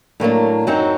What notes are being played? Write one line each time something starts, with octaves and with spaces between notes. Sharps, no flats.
A2 F#3 A#3 D4
F#2 F#3 C4 D#4 F#4